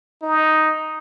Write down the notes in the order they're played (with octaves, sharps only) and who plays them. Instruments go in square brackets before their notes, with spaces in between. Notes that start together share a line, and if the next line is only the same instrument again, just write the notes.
[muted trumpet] D#4